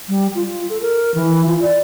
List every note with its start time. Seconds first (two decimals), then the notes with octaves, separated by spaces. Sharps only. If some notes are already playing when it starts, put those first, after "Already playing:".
0.09 G3
0.35 F4
0.69 A4
0.81 A#4
1.14 E3
1.46 F4
1.62 D5